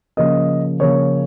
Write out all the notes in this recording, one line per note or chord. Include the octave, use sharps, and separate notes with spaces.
C#3 F3 A#3 C#4 D#5
C#3 F3 A#3 C#4 C#5